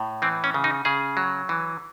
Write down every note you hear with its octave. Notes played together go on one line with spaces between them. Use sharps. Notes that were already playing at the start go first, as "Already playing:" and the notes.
Already playing: A2
E3 C4
C#4
C#3
D#4
C#3 G#4
F#3
E3